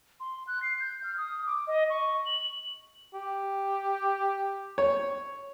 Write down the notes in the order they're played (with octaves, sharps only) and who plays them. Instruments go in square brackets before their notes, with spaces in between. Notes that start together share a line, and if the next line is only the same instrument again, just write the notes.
[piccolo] C6
F#6
C7
G6
F6
D#6
D6
D#5
C#6
F#7
[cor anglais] G4
[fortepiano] C#5